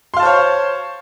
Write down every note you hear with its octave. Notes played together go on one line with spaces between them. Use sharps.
C5 C#5 F5 A5 C6